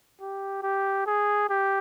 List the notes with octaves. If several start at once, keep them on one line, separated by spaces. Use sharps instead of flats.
G4
G4
G#4
G4